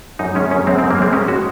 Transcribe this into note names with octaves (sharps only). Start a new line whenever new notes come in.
F#2 D#4
G#3 C#4
F#2 C#4
G#3 C4
C4
F#2
A#3
G#3 C4
G#3 C#4
G#3 F#4